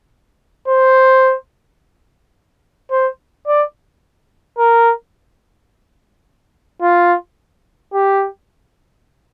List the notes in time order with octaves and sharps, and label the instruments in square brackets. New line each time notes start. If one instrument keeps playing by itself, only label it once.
[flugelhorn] C5
C5
D5
A#4
F4
G4